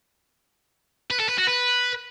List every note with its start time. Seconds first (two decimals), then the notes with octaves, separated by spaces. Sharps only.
1.11 B4
1.20 A4
1.29 B4
1.38 F#4
1.47 B4